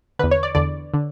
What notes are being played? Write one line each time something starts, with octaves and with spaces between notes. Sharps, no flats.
E2 D3 B4
C#5
D5
E2 D3 D5
D3